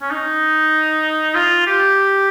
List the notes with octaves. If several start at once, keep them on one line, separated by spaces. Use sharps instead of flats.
C#4
D#4
F4
G4